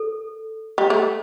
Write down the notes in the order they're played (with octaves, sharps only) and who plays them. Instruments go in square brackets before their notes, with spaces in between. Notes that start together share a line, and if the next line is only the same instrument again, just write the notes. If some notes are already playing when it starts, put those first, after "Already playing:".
Already playing: [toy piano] A4
[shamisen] G3
A3